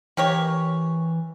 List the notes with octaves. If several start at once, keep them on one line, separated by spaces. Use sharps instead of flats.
E3 A#3 G4 C#5